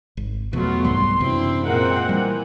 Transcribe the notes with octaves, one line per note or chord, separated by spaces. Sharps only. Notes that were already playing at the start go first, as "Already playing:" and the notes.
G#1
E2 B2 F#3 A3 B3 F4
C2 G#2 G3 C6
F#2 C3 E3 C4 D4 E4
A#2 G#3 C4 A#4 F#5
E3 G3